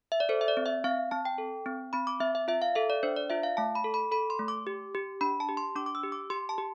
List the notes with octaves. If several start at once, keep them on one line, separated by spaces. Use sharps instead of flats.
E5
D5
A4 C5
E5
D5
C4
E5
C4 F5
C4 A5
G5
A4
C4
C4 B5
D6
C4 E5
E5
F4 E5
F5
A4 E5
D5
D4 C5
D5
F4 E5
F5
A3 A5
B5
A4
B5
A4 B5
C6
A3
D6
G4
G4
D4 B5
A5
G4
C6
D4 D6
D6
E6
G4
D6
G4 C6
A5
G4